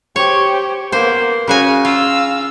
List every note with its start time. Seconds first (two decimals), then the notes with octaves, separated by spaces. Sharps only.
0.16 G4 C5 C#5
0.92 A#3 B3 C5
1.48 C#3 F#4 F5 G#5
1.85 F4 F5 E6